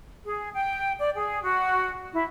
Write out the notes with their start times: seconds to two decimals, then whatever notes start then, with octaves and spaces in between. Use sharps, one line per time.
0.25 G#4
0.53 G5
0.99 D5
1.16 G#4
1.43 F#4
2.13 E4